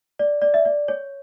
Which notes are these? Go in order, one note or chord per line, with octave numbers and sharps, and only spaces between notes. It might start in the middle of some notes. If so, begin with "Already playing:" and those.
D5
D5
E5
D5
C#5